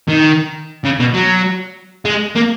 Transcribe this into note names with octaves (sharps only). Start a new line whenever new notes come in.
D#3
C#3
B2
F#3
G#3
A#3